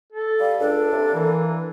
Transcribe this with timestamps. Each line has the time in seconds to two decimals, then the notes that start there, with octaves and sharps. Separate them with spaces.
0.12 A4
0.40 G3 F5
0.59 C#2 D4 A4
0.92 C3
1.14 E3 A#3